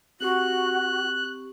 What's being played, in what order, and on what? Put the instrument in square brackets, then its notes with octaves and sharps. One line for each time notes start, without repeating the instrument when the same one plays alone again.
[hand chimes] C4 G4 C#6 [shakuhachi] F#4 [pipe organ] F#6